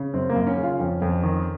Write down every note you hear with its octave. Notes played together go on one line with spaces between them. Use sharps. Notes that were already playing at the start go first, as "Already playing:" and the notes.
Already playing: C#3
F#2 C4
A#3
F#2
C#4
C#3
F4
F2 C#4
F2
D#3